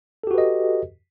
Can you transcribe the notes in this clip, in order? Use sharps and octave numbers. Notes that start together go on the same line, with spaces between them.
F#4 G4 A4 B4 D#5